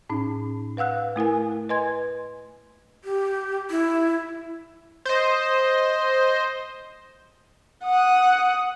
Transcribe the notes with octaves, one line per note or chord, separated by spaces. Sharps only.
A2 C#4 D#4
B4 F5 F#5 E6 F#6
A3 E4 A#4 G#5
B4 D#5 G#5 C6 G#6
G4
E4
C5 D#5
F#5 D#6